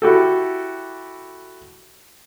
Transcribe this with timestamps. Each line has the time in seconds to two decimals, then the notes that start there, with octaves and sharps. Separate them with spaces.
0.02 E4 F#4 G4 A4